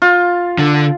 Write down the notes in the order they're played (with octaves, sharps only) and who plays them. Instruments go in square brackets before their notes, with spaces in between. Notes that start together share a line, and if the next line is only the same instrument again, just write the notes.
[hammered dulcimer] F4
[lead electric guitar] D3